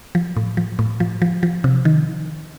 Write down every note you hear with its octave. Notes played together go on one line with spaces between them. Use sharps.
F3
A2
F3
A2
F3
F3
F3
C3
D#3